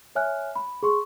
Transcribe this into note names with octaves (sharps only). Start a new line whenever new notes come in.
C#5 E5 G#5 F6 F#6
B5
G#4 C6 C#6